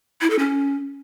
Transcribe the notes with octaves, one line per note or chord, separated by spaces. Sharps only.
E4
A4
C#4